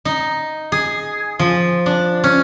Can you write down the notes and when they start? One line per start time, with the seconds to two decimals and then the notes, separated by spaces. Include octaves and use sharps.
0.05 D#4
0.72 G#4
1.39 F3
1.86 D4
2.24 C#4